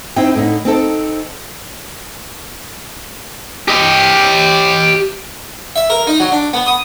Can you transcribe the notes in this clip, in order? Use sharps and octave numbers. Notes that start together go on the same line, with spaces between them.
C4 D#4 E4 G5
A2 D3 D#4
C4 D#4 A4
G4 D#5
E5
A#4
D#4
F#3
D4
B3
D#6